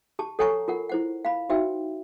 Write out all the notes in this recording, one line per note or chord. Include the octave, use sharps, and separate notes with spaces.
G4 A5
A4 C#5 F#5 G#5 A#5 C#6
F4 A#4 F#5
E4 C5 F#5
F5 B5
D#4 F#4 C5 E5 G5 E6